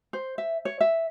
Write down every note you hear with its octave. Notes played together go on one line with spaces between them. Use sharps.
C5
E5
C#5
E5